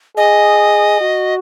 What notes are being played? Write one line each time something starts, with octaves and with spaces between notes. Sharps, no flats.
G#4 D#5
F#4